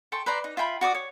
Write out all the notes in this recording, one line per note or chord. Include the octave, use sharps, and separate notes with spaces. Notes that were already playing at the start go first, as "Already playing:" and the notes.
A4 G5 C6 C#6
B4 C5 D5 A#5
D#4
F4 E5 G5 B5
F#4 D5 D6 D#6
C#5